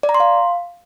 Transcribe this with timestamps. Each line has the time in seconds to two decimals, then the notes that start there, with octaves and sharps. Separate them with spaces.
0.03 D5
0.09 A#5
0.14 C6
0.20 F5